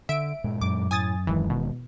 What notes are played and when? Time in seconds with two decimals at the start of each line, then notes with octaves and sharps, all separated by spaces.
0.09 D3 E5 D7
0.44 G2 A#2 G#3
0.61 F#2 D6
0.91 A2 G#5 D#6 A6
1.27 D#1 D#3 E3 G#3
1.50 B2